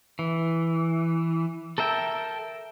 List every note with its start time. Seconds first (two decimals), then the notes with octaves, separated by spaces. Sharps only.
0.19 E3
1.78 A4 A#4 E5 G5